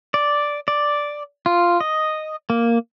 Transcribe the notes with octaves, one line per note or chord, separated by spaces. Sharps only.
D5
D5
F4
D#5
A#3